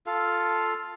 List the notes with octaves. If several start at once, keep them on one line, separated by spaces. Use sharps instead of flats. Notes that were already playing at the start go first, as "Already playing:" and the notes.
F4 A4 F5